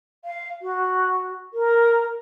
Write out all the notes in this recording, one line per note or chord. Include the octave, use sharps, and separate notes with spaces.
F5
F#4
A#4